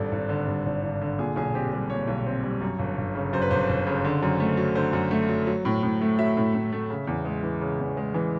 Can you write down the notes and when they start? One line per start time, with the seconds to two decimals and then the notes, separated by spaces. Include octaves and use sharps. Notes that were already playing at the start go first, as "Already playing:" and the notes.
Already playing: G#1 G2 A4
0.12 G#1
0.29 D3
0.47 G2
0.66 G#1
0.83 G#1
1.01 D3
1.19 A#2 G#4
1.36 B1 G#4
1.55 C4 G4
1.72 G3 G#4
1.90 A#2 C#5
2.08 B1
2.26 C4
2.43 G3
2.61 F#2
2.79 G1
2.97 G1
3.15 C#3
3.33 F#2 C5
3.42 B4
3.51 G1 C5
3.69 G1
3.87 C#3
4.05 D3
4.23 F#2
4.40 A3
4.57 F#3
4.75 D3 C5
4.93 F#2
5.11 A3
5.29 F#3
5.47 F#3
5.65 A2
5.83 A2
6.01 A3
6.19 F#3 E5
6.37 A2
6.54 A2
6.72 A3
6.90 C#3
7.07 E2
7.25 G#3
7.43 E3
7.61 C#3
7.79 E2
7.97 G#3
8.14 E3